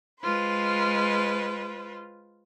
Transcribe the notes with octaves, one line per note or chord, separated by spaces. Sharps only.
G#3 F4 B4 C5